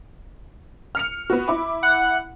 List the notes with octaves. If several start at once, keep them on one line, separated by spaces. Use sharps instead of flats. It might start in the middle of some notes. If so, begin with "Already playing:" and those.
F6 C#7 F7
B3 F#4
E4 B5 D6
F#5